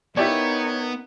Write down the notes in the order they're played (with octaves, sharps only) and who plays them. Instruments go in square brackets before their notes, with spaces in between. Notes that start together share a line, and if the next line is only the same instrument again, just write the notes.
[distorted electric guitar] B3 [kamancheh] D#4 A#4 [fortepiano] E4 G4 D5 [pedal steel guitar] C#5